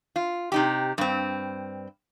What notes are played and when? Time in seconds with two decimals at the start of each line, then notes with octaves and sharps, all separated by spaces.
0.16 F4
0.52 C3 D#4 G4
0.98 G2 C4